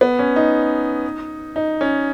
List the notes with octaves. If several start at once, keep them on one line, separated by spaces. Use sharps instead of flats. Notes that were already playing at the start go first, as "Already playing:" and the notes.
B3
C#4
D#4
D#4
C#4